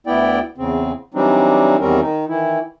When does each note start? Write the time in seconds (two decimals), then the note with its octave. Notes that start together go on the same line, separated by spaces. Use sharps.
0.07 D2 B3 E4 D5 G5
0.58 E2 C#3 C4
1.14 E3 F#3 G3 C4 D4 D#4
1.80 E2 D#3 G3 C4 C#4 A#4
2.01 D#3 D#4
2.28 D#3 E3 E4